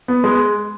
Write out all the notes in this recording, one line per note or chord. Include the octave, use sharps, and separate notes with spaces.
B3
G#3